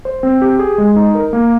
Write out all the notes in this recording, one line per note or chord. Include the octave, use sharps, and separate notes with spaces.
C5
C4
G4
G#4
G#3
D#4
A#4
A#3